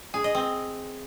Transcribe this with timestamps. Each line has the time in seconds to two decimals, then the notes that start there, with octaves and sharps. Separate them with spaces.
0.14 G#4
0.24 D#5
0.35 C4